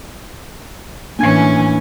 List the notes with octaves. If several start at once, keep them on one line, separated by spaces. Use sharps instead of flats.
A2 E3 A#3 C#4 D4 G#5 G#6